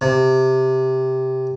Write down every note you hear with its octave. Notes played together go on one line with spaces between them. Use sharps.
C3